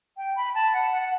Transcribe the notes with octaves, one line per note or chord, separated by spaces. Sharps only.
G5
B5
A5
F#5
F#5
F#5